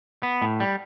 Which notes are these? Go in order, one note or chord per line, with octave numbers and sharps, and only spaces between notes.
B3
A2
G3